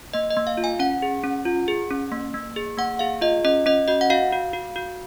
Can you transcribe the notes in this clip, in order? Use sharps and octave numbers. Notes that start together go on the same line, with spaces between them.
A#3 D#5
D#5
A#3
F5
F4
G#5
C#4 F#5
G#4
C#4
F4
G#4
C#4
A#3
A#3
G#4
A#3 F#5
G#4 F5
F4 D#5
C#4 D#5
C#4 D#5
F#4 D#5
F#5
F#4 F5
F#4
F#4
F#4